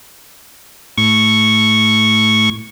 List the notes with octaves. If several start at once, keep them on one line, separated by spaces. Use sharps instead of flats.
A2 C#6 G#6